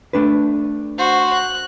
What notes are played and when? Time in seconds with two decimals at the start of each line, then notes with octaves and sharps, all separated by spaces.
0.13 A3 D4 B4
0.98 F#4 C5
1.34 F#6